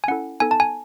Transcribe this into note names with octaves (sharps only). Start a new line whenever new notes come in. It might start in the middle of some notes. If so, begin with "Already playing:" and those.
G#5
C#4 E4 A4 F#5
B3 D#4 A4 G#5
A5
G#5